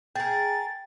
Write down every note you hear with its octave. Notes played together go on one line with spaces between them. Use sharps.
G#4 A#4 G5 A6